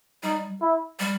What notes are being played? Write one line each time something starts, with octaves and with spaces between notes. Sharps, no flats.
G3 D#4
E4
G3